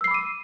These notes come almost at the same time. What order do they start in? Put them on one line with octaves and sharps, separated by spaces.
E6 C7 B5 D6 D#7